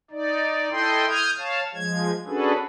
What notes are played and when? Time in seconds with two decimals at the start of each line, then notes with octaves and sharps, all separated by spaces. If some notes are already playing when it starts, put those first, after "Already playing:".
0.11 D#4 D5
0.70 E4 A4 D#5 G5 C6
1.09 D#6 F6 G6 G#6
1.38 C#5 F5 A5
1.74 F3 G#3 G#6
2.27 C#4 D4 F#4 G#4 A4 B4